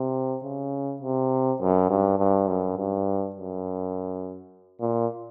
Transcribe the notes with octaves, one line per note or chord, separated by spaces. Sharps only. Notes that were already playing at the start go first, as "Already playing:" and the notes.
Already playing: C3
C#3
C3
F#2
G2
G2
F#2
G2
F#2
A#2